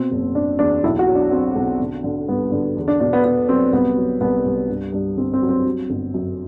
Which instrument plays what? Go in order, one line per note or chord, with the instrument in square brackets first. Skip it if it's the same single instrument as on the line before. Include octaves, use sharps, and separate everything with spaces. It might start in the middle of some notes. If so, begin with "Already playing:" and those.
Already playing: [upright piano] B2 C4
F#1
F#1 D4
E2 D4
B1 E4
F#4
F#3
D4
F#3 C4
B1
D3
D3
G2 B3
D3
E2
D4
B2 D4
B3
B2 B3
F#3 C4
C2 B3
F#3
C2 B3
C2
G2
G2
G1 C4
C4
F#3
C4
F#3
G1
F#2